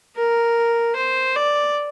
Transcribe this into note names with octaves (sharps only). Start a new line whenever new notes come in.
A#4
C5
D5